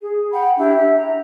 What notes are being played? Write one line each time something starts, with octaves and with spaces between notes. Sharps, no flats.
G#4
F#5 G5 B5
D4 E4 G4
E5
A#5